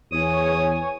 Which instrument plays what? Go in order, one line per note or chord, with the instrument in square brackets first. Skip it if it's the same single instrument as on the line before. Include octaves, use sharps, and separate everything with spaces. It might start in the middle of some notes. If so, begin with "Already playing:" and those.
[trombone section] E2 [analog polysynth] C#5 G#5 [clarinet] D#6